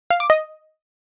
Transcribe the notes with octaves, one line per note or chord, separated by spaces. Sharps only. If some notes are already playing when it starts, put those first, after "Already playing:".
F5
D6
D#5